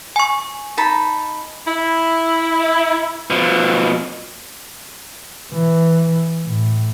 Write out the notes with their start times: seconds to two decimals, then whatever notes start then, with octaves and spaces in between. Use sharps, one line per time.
0.16 G#5 C#6
0.77 D#4 A5 B5
1.66 E4
3.30 B2 F3
5.52 E3
6.45 A2